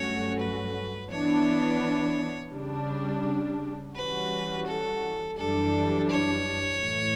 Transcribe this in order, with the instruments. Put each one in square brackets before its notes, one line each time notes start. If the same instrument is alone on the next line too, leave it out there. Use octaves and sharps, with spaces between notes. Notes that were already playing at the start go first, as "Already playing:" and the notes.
Already playing: [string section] G2 F#3 A3 C#4 F#4 [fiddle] C#5
[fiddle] B4
[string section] E3 B3 D4 [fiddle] C#5
[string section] C#3 G3 D4
[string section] E3 G3 C#4 F#4 [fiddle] B4
[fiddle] A4
[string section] F#2 E3 G3 D4 [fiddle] A4
[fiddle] C#5
[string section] A2 E3 A3